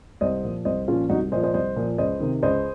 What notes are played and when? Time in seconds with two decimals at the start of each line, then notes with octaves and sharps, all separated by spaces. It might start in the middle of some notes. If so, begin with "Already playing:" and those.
0.21 C2 C5 D#5
0.44 A#2 F3
0.65 C2 C5 D#5
0.88 A#2 F3 C#4 F4
1.10 C2 D#4 F#4
1.32 A#2 F3 C5 D#5
1.43 C5 D#5
1.54 C2 C5 D#5
1.76 A#2 F3
1.98 C#2 C5 D#5
2.20 C3 D#3
2.43 C#2 C5 D#5